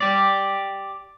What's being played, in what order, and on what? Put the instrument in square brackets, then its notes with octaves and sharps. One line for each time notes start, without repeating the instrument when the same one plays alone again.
[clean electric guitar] G4 D5